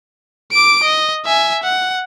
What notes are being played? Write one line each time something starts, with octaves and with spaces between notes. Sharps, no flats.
D6 D7
D#5
E5 G#5
F#5